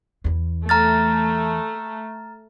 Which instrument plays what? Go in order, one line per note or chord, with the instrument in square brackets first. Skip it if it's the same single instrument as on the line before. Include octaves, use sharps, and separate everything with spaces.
[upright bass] E2 E3
[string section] A3 [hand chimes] A#5 F6 A6